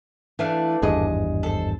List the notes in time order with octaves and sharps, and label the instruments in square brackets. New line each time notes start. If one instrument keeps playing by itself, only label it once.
[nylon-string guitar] E3 [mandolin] A3 D4 F5
[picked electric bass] G#1 E2 G2 [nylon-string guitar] G#4 D#5
[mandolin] A4 C5